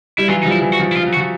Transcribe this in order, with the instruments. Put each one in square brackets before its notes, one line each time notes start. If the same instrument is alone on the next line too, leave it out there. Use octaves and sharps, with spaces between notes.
[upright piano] G3 [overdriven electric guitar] E4
[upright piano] E3 F#3 [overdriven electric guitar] F4
[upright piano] F3 G3 [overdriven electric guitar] D#4
[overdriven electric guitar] E4
[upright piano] E3 F#3
[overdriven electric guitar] F#4
[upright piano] F3
[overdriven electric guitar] E4
[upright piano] F3 [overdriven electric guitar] F4
[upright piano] F#3
[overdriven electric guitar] F#4
[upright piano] F3